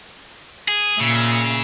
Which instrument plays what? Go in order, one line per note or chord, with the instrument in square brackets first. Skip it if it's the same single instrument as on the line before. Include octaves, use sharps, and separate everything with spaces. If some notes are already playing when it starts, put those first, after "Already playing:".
[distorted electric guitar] G#4
[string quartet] A#2 E5 [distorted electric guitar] C#3